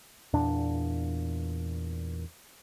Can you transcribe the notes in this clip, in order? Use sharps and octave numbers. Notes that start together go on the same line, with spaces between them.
E2 A#2 D4